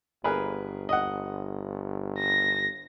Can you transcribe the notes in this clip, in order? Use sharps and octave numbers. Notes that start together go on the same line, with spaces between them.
G1 G#4 A#4 B4
D#5 F#5
A#6